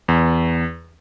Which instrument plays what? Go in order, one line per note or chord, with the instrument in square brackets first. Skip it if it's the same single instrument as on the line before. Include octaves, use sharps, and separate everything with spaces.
[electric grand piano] E2